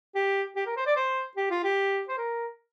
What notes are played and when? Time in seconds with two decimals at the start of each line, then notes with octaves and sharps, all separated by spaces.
0.15 G4
0.56 G4
0.66 A#4
0.77 C5
0.86 D5
0.96 C5
1.37 G4
1.50 F4
1.64 G4
2.09 C5
2.18 A#4